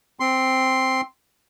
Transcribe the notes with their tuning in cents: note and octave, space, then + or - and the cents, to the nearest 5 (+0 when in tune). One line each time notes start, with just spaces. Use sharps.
C4 +0 C6 +0